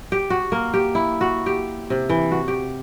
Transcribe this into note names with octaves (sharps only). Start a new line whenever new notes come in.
G4
F#4
A#3
G4
E4
F#4
G4
C3
E3
F#4
G4